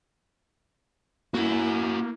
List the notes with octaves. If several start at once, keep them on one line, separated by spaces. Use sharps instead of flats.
A#3 E4 F#4 A#4